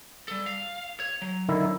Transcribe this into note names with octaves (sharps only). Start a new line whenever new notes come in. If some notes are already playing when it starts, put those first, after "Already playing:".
G3 A4
F5
C#5
F#3
D3 D#3 E4